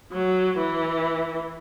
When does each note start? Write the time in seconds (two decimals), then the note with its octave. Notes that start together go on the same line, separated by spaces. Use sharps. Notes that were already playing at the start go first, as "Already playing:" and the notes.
0.12 F#3
0.57 E3